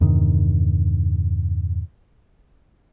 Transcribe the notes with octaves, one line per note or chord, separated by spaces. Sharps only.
E2 G2 C3 D#3